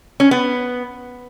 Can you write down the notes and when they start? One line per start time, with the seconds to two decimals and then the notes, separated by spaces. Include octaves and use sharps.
0.20 C#4
0.31 B3